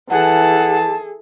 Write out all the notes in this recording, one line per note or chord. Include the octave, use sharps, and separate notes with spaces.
E3 G#4 A4 F#5 A5